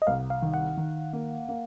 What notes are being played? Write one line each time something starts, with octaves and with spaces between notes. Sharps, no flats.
D#5
C2 F5
F5
D#3
F#5
D#3
A#3
A#3